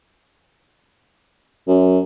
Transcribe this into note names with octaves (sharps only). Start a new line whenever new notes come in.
F#2